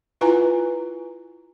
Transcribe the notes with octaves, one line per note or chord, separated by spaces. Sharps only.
E4 F4 B4 G#5 A#5